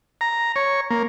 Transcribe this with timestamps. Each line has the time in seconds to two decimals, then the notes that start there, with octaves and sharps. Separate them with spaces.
0.21 A#5
0.56 C#5
0.91 A#3